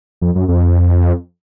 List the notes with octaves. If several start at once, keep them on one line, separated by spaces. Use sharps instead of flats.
F2
F#2
F2